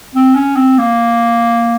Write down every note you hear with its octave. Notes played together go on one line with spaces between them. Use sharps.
C4
C#4
C4
A#3